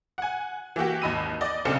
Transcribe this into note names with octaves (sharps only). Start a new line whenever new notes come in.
F#5 G#5
E3 A#3 F#4 G4
G#1 D#2 D#5 B5 E6 D#7
D5 D#5
B1 C#3 C4 D4 A4 C#7